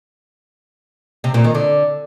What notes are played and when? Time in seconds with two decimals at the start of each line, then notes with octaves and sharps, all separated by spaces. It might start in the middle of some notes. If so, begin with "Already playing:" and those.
1.24 C3
1.34 A#2
1.44 D#3
1.55 D3